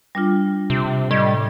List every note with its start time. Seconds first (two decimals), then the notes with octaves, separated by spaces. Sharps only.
0.15 G3 D4 F4
0.70 C3
1.11 A2 G3 D#5 G#6